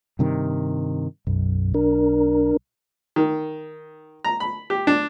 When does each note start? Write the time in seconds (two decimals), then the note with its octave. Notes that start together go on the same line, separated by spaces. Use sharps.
0.19 G2 C3 D#3
1.27 B1 F#2
1.74 D4 A#4
3.16 D#3
4.25 A#5
4.40 B5
4.70 G4
4.87 D4